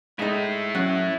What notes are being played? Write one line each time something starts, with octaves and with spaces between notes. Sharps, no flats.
G#3 D#4 E4 A4
F#3 C#4 F#5